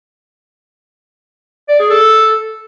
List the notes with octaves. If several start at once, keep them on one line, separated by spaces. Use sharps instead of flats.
D5
G#4
A4